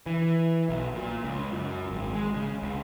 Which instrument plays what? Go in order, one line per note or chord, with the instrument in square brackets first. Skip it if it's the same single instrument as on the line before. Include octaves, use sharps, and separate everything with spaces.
[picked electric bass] E3
B1
A#2
C#2
F#2
G#1
G#3
C#3
C#2